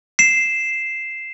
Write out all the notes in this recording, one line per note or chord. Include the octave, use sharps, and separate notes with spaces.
C7 E7